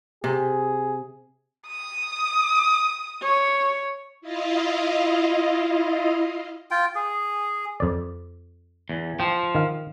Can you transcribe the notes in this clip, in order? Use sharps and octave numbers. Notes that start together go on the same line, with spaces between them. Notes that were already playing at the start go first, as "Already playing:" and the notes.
C3 G#4
D#6
C#5
E4 F4 D#5 F5
F4 G5
G#4
F2 D5
E2
F3 G5
D#3 F5